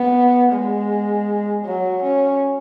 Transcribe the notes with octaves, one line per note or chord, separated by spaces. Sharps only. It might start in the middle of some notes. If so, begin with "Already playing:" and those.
Already playing: B3
G#3
F#3
C#4